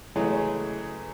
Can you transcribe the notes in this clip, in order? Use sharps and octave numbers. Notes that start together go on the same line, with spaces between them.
C#3 E3 F#3 G#3 A3 G#4